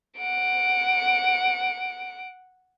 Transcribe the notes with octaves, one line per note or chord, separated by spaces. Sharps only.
F#5 D7